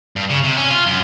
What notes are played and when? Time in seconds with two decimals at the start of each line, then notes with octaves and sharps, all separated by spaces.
0.16 G2
0.30 C#3
0.44 C3
0.57 C#4
0.71 F4
0.86 F#2